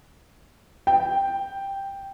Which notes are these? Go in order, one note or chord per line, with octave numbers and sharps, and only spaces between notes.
G5